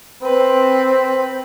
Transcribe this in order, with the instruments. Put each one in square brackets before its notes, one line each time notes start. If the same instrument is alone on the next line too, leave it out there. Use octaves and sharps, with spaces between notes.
[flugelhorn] C4 [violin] B4